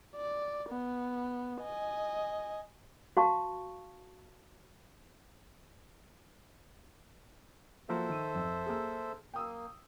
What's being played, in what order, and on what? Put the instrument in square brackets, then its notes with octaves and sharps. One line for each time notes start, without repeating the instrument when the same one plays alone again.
[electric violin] D5
B3
D#5 G#5
[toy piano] F#4 F5 A5 C#6
[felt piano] F3 A#3 F#4 [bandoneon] A4 C5 E5
[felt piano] D#3 D#7
F2
A#3 G#4
[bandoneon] A#3 [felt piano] G5 D#6 E6